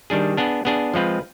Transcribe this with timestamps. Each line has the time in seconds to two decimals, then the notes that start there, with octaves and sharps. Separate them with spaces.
0.10 D#3 G3 D4 G#4
0.37 B3 D4 G#4
0.65 B3 D4 G#4
0.93 F3 G#3 C4 F4 B4